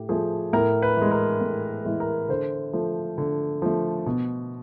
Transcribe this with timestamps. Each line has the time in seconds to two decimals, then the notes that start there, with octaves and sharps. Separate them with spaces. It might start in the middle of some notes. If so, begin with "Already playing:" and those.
Already playing: A2 G4
0.09 F3 A3 G#4
0.53 A2 A#4
0.82 B4
0.97 E3 G#3
1.11 A#4
1.41 A2
1.85 E3 G#3
2.00 A#4
2.29 D3 C5
2.73 F3 A3
3.18 D3
3.62 F3 A3
4.06 B2